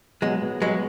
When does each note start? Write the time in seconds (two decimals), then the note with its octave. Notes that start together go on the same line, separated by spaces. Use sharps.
0.22 F#3 G#3 B3
0.42 B3
0.62 F#3 G#3 B3